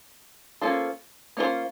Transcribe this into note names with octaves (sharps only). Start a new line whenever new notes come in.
A#3 C#4 F4 A4 C5
A#3 C#4 F4 A4 C5